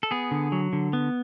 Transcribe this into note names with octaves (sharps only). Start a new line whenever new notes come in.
A4
B3 G#4
D3
F#3
D3
B3